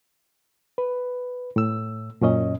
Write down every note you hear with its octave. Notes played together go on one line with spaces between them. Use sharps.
B4
A2 E6
F#2 A#2 C#4 D#5